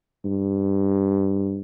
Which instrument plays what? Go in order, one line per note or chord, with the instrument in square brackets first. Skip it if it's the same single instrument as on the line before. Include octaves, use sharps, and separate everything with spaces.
[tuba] G2